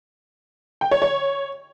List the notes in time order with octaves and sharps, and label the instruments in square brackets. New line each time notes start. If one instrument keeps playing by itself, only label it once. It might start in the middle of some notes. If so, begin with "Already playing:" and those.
[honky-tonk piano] G5
C#5
C#5